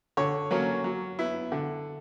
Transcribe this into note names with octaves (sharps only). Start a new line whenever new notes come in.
D3 C#5
F#3 A#3 C#4
F#3
B3 E4
D3